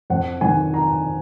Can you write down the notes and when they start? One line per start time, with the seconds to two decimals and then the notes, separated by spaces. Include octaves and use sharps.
0.10 F2 F#5
0.41 D#3 G#5
0.74 A#5